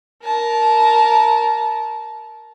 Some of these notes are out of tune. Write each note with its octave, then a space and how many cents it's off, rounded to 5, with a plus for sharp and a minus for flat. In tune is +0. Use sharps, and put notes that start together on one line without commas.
A#4 +0 A5 -20